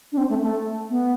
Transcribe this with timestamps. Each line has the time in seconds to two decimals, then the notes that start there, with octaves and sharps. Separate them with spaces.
0.12 D4
0.17 C4
0.29 A3
0.42 A3
0.90 B3